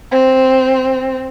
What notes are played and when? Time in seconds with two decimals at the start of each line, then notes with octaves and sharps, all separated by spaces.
0.10 C4